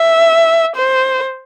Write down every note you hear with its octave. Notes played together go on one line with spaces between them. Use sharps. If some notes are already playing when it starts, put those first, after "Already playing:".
Already playing: E5
C5